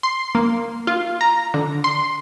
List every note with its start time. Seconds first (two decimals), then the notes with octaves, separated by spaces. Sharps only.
0.03 C6
0.35 A#3
0.87 F4
1.21 A#5
1.54 D3
1.84 C6